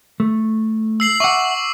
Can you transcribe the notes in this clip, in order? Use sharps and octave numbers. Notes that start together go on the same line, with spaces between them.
A3
E6 C7 F#7
E5 F#5 C#6 D6 E6